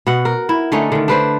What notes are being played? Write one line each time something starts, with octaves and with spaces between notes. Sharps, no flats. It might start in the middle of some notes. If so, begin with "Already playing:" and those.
B2 F#5
A#4
E4
D3 A3 C#4 D#4
D3 D#3
D4 B4 C5